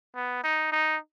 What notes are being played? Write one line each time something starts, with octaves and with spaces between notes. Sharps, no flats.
B3
D#4
D#4